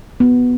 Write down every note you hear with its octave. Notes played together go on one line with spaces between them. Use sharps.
B3